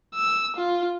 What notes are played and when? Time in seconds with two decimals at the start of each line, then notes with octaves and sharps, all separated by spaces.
0.15 E6
0.56 F4